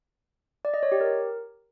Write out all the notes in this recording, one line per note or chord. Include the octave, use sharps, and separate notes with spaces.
D5
D#5
C#5
G4
A#4